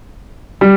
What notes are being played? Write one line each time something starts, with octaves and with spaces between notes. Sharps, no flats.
G3